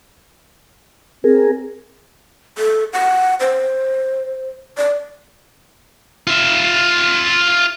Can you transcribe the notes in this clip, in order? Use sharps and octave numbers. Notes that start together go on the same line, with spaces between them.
C4 G#4 A#4
A4
F#5
C5
D5
F4 E5